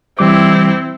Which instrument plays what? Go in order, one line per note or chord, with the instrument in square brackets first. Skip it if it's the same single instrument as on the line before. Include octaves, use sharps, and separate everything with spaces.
[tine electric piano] E3 G3 D6 [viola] C4 E4